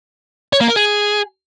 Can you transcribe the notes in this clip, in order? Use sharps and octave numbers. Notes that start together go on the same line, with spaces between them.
C#5
A#3
A#4
G#4